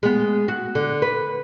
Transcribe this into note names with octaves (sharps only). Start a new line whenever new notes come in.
G#3 B3
F#4
D3
B4